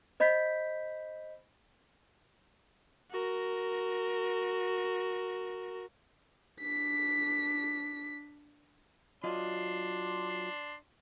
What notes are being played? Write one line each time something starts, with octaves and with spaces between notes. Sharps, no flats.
C5 D#5 B5 G6 B6
F#4 A#4
D4 B6
F#3 D4 F4 D#5 C6